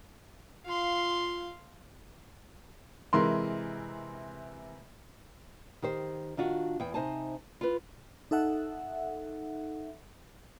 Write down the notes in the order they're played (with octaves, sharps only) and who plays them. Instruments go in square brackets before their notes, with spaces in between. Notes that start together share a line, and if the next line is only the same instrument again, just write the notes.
[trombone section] F4 [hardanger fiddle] F5 C6
[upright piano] C3 E3 G#3 A#4 C6
[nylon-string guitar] D#3 G4 C5
D#3 D4 F4 F#4
E2 G5
C3 D#4 C5 D#5 G#5 A5
F4 B4
[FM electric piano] D#4 A4 E5 F#5